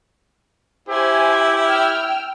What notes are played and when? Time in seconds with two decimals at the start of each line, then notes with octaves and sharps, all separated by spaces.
0.89 E4 G4 C5 G#5
1.67 G5 E6 F6